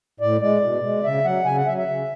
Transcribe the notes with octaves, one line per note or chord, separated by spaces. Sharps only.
A2 D5
G#3 D5
B2
G#3
C#3 E5
F#3 F#5
C#3 G#5
F#5
F#3 E5
E5
C#3